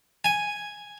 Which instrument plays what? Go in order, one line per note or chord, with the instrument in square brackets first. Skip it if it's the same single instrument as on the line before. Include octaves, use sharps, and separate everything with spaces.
[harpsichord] G#5